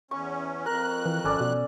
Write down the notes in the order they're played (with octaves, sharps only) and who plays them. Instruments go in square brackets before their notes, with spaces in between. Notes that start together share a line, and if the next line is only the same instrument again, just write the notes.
[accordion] E2 C#4 [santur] C#6
[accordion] F2 F#6 [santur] A#4
[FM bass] E3
[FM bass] G#1 [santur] C#4 A4 D5
[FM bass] B2